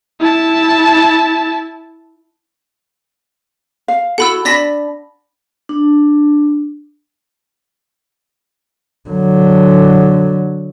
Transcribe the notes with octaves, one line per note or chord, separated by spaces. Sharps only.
E4 A5
F5
E4 F#4 A4 F#5 B5 E6
D4 D5 A5 B5 A#6 B6
D4
D3 F#3